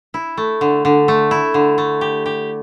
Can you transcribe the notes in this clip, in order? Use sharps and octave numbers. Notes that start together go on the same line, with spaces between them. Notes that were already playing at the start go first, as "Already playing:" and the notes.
E4
A3
D3
D3
A3
E4
D3
A3
G4
G4